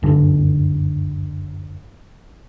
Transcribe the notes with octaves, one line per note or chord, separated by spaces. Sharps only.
F#1 D2 G2 D3